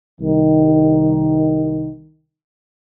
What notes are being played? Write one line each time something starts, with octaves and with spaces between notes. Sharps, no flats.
C2 D#3